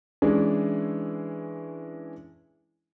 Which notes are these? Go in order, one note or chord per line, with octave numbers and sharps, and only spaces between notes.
E3 G#3 C#4 D4 E4 G#4